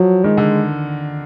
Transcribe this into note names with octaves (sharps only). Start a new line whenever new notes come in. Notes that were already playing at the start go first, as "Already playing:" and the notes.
Already playing: F3 F#3
D#3 G#3
D3